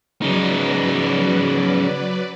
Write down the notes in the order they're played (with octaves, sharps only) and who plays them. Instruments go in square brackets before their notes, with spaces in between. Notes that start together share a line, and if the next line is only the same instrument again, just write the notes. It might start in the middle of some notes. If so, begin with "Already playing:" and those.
[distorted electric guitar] C#3 D#4 [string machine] F#3 B4 D5